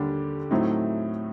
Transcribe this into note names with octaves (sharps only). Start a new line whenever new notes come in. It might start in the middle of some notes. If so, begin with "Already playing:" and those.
Already playing: D#2 D3 G3 D4 G4
A2 F#3 A3 C4 D#4